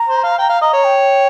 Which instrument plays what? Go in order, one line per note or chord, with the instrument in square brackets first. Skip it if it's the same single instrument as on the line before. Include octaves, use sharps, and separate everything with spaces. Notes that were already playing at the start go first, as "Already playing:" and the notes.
Already playing: [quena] A#5
[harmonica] C5
F5
[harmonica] G5 [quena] A#5
[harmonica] F5
[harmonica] D#5 [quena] A#5
[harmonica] C#5
[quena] G5